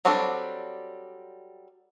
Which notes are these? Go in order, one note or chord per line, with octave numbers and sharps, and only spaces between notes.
F#3 G3 C4 D4 A4